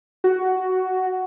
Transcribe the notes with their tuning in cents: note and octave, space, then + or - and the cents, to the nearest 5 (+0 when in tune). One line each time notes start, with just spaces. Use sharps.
F#4 +10